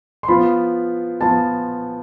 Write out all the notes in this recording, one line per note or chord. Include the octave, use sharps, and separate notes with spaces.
C6
F3 B3 F4 B5
F3 B3 F4 A5